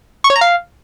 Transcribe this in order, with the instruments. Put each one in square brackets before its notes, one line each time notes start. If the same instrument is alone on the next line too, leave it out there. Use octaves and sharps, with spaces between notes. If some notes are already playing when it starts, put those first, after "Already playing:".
[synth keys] C#6
C#5
A#5
F5